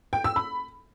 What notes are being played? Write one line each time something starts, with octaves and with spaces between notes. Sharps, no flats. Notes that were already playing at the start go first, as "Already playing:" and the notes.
G5
E6
B5